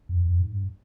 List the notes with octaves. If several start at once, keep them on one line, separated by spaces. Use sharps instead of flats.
F2
F2
G#2
G2